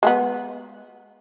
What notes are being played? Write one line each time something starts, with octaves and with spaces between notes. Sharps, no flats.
G#3 A3 B3